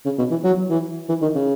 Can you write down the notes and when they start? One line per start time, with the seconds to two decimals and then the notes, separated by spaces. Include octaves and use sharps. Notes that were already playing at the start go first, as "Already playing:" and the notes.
0.05 C#3
0.18 B2
0.31 E3
0.44 F#3
0.70 E3
1.09 E3
1.22 D#3
1.35 C#3